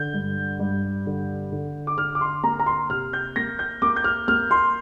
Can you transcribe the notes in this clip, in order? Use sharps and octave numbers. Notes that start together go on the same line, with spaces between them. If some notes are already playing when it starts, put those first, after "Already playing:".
Already playing: D3 G6
G2
G2
D3
D3
D6
D3 F6
D6
C6
A#3 A#5
A#5
C6
C3 F6
G6
A#3 A#6
G6
A#3 D6
G6
F6
A#3 F6
C6